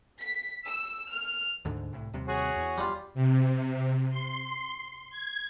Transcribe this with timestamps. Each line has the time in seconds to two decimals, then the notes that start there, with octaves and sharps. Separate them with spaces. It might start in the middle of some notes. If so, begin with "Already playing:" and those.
0.20 B6
0.66 E6
1.11 F6
1.65 D2 G#2 D3
1.92 C2 A2
2.13 D#2 C3 G3
2.28 F#4 G#4 C#5
2.56 E2
2.78 G3 F4
3.14 C3
4.10 C6
5.11 G#6